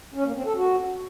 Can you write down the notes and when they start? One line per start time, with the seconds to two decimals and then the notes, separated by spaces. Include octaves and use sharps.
0.14 C#4
0.25 A#3
0.35 C4
0.46 A4
0.56 F#4